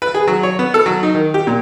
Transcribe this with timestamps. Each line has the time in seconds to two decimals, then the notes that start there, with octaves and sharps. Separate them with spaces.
0.02 B4
0.14 G#4
0.28 F#3
0.43 C#5
0.59 B3
0.74 A4
0.86 F#3
1.03 D#4
1.15 D#3
1.34 G4
1.47 A#2